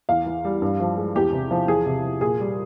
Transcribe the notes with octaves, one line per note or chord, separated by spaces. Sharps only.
E2 F5
E3
G3
G2
F3
G#3
E2 G4
C3
F3
E2 G#4
C3
F3
A#2 G#4
G3